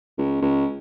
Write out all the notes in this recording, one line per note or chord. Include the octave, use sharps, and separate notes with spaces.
C#2
C#2